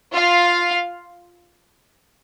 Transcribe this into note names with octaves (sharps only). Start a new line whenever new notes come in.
F4 F5